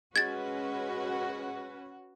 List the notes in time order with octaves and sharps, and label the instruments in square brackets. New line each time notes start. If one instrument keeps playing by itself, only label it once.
[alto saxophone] G#3 [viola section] C#4 B4 [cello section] F#4 [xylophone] G#6 A6